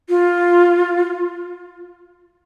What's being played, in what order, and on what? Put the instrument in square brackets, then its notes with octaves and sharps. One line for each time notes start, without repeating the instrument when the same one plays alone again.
[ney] F4